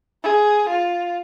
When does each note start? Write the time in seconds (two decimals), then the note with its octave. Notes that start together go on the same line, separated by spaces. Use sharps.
0.23 G#4
0.69 F4